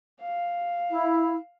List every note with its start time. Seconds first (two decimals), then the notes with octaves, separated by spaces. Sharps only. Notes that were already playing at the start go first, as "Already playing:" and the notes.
0.21 F5
0.90 E4